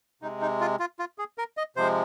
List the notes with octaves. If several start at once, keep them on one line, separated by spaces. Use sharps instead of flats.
C3 G#3 D#4
D#4
F4
F4
F4
G#4
A#4
D#5
C3 F3 G#3 C5